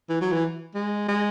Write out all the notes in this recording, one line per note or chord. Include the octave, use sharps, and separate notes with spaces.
E3
F#3
E3
G#3
G#3